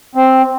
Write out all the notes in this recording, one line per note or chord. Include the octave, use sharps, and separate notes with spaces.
C4